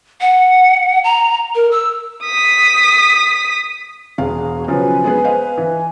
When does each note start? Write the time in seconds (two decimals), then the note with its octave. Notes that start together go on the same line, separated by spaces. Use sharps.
0.21 F#5
1.04 A#5
1.55 A#4
1.71 E6
2.23 D#6 B6
4.18 E1 F#4 G#4 F5
4.68 C#3 F3 F#3 B4 G#5
5.04 G#3 B3 G#4
5.24 C5 D#5 F5
5.58 E3